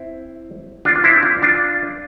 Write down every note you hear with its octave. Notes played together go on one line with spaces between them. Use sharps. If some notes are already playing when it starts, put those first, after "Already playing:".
Already playing: C4 E4
D4 F4
D4
C4 E4
D4 F4
D4 F4